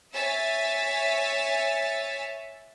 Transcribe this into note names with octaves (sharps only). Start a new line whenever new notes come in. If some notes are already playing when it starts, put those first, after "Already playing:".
C#5 E5 G#5 E6 A6 B6